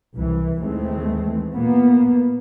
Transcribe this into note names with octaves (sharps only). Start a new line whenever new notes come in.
C2 E3
D#2 E3 G#3 A3 C4
A#2 A#3 B3